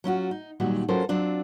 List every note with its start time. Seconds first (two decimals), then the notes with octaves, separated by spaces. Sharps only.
0.04 F#3 C#4 F4 F#4
0.31 D#4
0.60 A#2 D#3 F#3 G3 F#4
0.88 F#3 C#4 F4 A4 A#4 C5
1.09 F#3 C4 D4 F4